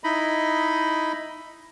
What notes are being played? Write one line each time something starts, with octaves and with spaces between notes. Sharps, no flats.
D#4 E4 D#5 B5